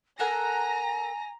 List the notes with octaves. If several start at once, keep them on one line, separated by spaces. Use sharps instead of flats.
A4 A#4 F#5 G#5 A#5 A#6